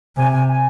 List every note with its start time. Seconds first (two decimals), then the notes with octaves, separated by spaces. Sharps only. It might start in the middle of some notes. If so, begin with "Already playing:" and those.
0.16 C3 G#5
0.32 G#5
0.48 G#5